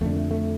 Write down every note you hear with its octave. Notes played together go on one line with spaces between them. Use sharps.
F2 D3 A3
A3
A3